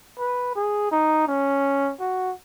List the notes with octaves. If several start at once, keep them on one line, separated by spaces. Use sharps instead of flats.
B4
G#4
D#4
C#4
F#4